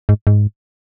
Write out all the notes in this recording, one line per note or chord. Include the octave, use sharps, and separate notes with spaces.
G#2
G#2